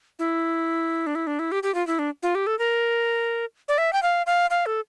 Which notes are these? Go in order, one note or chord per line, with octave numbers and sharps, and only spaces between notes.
E4
D4
E4
D4
E4
G4
G4
F4
E4
D4
F4
G4
A4
A#4
D5
E5
G5
F5
F5
F5
A4